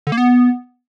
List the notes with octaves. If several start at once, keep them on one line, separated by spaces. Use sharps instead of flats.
D3
A#3
B3